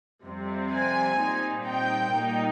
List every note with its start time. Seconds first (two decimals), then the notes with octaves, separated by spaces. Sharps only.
0.24 F2 C3 G3 C4
0.72 G#5
1.19 A#2 G3 C4 D#4
1.67 G5
2.14 A#2 G3 A#3 D#4